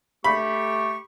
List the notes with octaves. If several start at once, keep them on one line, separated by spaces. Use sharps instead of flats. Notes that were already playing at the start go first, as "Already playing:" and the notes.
A3 G4 B5 C#6